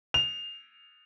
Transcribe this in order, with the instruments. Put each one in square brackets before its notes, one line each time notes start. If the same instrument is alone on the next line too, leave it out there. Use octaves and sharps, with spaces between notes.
[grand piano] F7